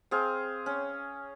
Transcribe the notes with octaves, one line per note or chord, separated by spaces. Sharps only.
C4 G#4 F5
C#4